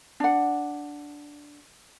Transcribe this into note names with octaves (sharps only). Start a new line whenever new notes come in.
D4 F#5